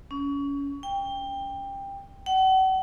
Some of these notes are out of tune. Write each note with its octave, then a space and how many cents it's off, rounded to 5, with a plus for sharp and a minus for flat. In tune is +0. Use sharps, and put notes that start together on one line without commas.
C#4 +25
G5 +15
F#5 +40